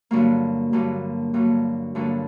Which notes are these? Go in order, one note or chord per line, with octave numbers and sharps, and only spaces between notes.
G2 D3 F#3 A#3
G2 D3 F#3 A#3
G2 D3 F#3 A#3
G2 D3 F#3 A#3